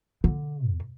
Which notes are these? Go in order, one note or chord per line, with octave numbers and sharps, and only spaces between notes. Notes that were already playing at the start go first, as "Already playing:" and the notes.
D3
E2